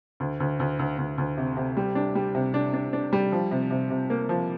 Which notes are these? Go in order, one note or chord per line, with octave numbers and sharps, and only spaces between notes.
D2
D2
D2
D2
D2
D2
C3
C3
G3
D4
G3
C3
D4
D4
D4
G3
F3
C3
C3
C3
A#3
F3